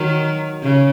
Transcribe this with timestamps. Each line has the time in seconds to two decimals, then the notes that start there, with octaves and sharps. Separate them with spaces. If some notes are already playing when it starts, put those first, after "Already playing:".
Already playing: D#3 F#3
0.62 C#3